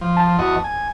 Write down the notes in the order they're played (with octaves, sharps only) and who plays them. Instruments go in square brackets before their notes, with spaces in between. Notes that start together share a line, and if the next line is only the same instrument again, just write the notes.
[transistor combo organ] F3
[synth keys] A5
[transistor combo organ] E2 F#4 D#5
G#5